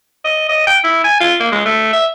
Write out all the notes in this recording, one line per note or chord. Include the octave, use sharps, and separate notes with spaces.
D#5
D#5
G5
E4
G#5
F4
A#3
G#3
A3
E5